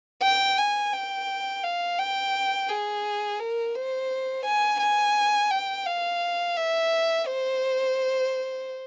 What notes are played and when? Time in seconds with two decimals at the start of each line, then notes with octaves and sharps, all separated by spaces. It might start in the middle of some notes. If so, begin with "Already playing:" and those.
0.23 G5
0.58 G#5
0.93 G5
1.64 F5
1.99 G5
2.69 G#4
3.40 A#4
3.75 C5
4.45 G#5
4.80 G#5
5.51 G5
5.86 F5
6.57 E5
7.27 C5